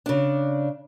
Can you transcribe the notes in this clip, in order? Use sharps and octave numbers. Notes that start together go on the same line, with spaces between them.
C#3 D4